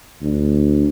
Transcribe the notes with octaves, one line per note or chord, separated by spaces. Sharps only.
D2